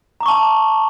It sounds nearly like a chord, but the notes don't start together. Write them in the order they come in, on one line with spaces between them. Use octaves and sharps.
A#5 D6 C#6 A5